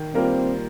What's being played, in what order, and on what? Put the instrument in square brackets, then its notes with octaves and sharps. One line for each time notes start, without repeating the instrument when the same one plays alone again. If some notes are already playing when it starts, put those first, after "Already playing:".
Already playing: [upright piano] D#3
[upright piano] G3 A#3 F4 A#4 [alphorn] C4